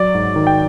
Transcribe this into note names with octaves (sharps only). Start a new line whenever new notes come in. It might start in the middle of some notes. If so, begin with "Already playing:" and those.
Already playing: F#3 D5
G#2
D#3
G5